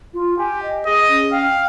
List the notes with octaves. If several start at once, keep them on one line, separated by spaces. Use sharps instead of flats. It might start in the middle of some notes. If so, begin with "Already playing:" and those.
F4
G4 G#5
D#5
G#4 D#5
C#4
F5 G5